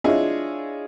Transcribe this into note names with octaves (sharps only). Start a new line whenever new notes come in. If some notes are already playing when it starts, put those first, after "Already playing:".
D4 E4 F4 G#4 C#5 D#5